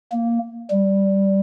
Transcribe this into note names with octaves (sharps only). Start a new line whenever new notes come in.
A#3
G3